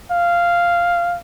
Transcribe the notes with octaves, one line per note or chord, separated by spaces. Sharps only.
F5